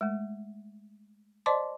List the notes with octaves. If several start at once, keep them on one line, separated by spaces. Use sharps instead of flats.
G#3 A3
C5 D5 D#5 A5 C6 D6